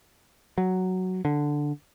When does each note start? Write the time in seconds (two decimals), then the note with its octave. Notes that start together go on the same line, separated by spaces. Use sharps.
0.58 F#3
1.25 D3